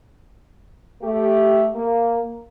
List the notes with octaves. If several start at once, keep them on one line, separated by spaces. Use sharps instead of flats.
A3 G4
A#3